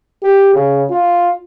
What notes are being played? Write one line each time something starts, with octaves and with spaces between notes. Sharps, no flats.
G4
C#3
F4